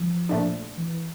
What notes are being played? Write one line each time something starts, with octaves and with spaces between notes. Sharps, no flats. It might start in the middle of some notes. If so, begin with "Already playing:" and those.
Already playing: F3
A#2 A3 D4
E3